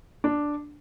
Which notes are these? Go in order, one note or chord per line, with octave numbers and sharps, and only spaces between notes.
D4